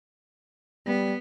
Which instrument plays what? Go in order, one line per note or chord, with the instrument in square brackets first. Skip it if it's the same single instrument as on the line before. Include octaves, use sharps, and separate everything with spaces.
[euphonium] G3 [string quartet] B3